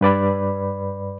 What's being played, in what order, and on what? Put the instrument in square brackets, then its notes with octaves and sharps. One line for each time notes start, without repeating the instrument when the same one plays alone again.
[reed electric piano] G2 B4 D5 B5